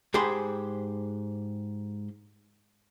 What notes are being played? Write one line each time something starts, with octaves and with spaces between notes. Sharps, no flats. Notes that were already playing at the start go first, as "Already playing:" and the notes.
G#2 G4 G#4 C5 B5 C6